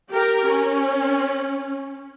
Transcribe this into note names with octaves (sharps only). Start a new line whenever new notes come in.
G4 A#4
C#4